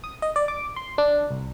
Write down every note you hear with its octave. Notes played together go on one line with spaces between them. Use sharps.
D#6
D#5
D5
D6
C6
D4
C2